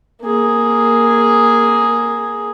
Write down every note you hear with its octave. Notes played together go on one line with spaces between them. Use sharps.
A#3 G#4